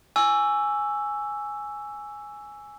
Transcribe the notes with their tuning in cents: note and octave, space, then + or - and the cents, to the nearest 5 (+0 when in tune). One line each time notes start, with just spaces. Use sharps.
G#5 +0 C#6 +35 E6 +5